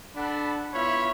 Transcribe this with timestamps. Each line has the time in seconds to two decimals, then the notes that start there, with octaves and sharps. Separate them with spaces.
0.16 D4 A4 F#5 B5
0.74 B3 E4 F4 C#5 E5 B5